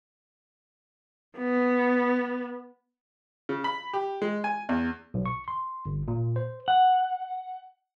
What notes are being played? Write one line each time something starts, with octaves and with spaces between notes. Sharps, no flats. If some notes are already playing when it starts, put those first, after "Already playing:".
B3
C#3
B5
G4
G#3
G#5
E2
B1
C#6
C6
G1
A#2
C5
F#5